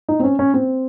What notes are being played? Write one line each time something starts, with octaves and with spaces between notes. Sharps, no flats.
D#4
C4
C#4
C#4
C4